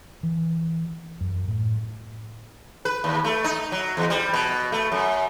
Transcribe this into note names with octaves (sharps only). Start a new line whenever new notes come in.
E3
F#2
A2
B4
D#2
A3
D#4
F#3
E2
G3
B2
A3
F#2